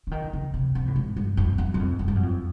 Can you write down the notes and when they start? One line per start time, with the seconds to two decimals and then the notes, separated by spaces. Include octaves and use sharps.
0.07 D3
0.11 D#3
0.33 C#3
0.54 C3
0.75 C3
0.87 A2
0.96 G#2
1.16 G2
1.37 F2
1.58 F#2
1.74 F#2
1.79 F2
1.99 F#2
2.08 G2
2.16 F#2
2.23 F2